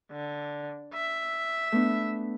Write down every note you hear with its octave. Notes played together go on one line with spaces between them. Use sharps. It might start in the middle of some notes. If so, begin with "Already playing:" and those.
D3
E5
A3 B3 D4